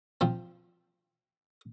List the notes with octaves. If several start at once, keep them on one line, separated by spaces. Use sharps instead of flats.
F3 C4